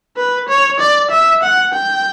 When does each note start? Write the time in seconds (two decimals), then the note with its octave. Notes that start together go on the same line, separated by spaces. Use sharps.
0.17 B4
0.49 C#5
0.80 D5
1.11 E5
1.43 F#5
1.74 G5